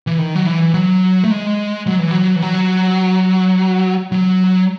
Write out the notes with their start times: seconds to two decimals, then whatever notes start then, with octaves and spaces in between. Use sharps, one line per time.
0.07 E3
0.18 D#3
0.35 F#3
0.46 E3
0.74 F#3
1.24 A3
1.31 G#3
1.86 F#3
1.99 E3
2.11 F#3
2.36 E3
2.42 F#3
4.12 F#3